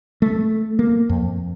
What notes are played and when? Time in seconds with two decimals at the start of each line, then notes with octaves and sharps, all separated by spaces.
0.22 A3
0.79 A#3
1.09 F2